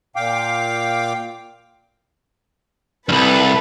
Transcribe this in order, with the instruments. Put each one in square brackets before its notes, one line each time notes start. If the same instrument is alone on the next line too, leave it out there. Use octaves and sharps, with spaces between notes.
[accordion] A#2 F5 G5 D6
[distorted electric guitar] C2 G2 [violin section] A4 B4